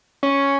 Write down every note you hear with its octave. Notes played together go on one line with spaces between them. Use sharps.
C#4